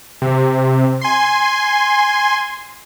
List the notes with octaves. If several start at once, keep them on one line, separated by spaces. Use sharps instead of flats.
C3
G#5 C6